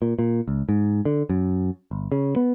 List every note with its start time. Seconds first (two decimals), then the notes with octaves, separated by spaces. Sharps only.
0.02 A#2
0.19 A#2
0.48 C#2
0.69 G#2
1.05 D3
1.30 F#2
1.91 G1
2.12 C#3
2.36 B3